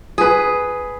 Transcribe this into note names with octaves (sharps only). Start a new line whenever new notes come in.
G#4 B4